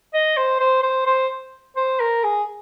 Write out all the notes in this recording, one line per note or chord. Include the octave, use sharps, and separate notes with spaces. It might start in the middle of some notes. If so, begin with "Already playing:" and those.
D#5
C5
C5
C5
C5
C5
A#4
G#4